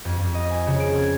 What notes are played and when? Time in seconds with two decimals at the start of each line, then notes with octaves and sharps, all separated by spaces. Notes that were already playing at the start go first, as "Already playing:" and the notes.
0.05 F2
0.19 F2
0.35 D#5
0.50 G#5
0.67 C#3
0.80 D7
0.98 G#6